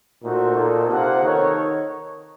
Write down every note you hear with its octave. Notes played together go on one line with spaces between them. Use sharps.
A#2 A3 D#4 F#4 C5
A#2 A#3 D#4 A4
C3 A#3 F4 C5 F#5
D#3 D#4 A4 C#5